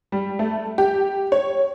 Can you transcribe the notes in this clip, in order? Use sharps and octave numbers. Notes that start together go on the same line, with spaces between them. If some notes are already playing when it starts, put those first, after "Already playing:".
G3
A3
G4
C#5